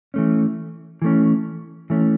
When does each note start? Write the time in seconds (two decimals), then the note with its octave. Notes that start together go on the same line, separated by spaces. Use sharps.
0.14 E3 A3 C#4
1.02 E3 A3 C#4
1.90 E3 A3 C#4